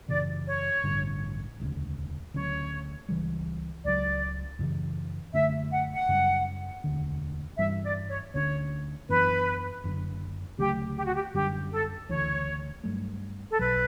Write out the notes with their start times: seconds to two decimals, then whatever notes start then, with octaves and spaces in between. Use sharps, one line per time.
0.09 F#2 C#3 E3 D5
0.47 C#5
0.84 A1 G2 D3
1.60 E1 D2 C#3
2.34 D2 C#3 F#3 C#4 C#5
3.09 C#2 C#3 E3 G3
3.84 C#2 C#3 F#3 D5
4.59 F#2 C#3 E3
5.34 F#2 D3 A3 E5
5.72 F#5
5.94 F#5
6.09 F#2 C#3 G3 C#4
6.84 E1 D2 D3
7.59 G2 E3 G3 C#4 E5
7.84 D5
8.09 C#5
8.34 D2 D3 G3 C#4 C#5
9.09 F#2 E3 B3 D4 B4
9.84 F#1 F#2 D3
10.58 D2 C#3 F#3 A3 G4
10.96 G4
11.05 F#4
11.14 G4
11.34 F#2 D3 G3 C#4 G4
11.71 A4
12.09 D2 C#3 E3 C#5
12.84 G2 F#3 A3
13.50 A4
13.59 B1 B2 F#3 B4